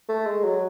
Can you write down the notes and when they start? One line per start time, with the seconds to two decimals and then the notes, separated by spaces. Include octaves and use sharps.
0.09 A3
0.26 G#3
0.44 F#3